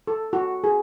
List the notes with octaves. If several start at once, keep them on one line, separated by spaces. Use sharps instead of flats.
A4
F#4
G#4